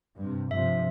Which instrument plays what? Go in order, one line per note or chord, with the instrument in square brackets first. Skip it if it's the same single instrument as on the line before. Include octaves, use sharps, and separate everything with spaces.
[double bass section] G2 C3
[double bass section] G2 C3 F3 [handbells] E5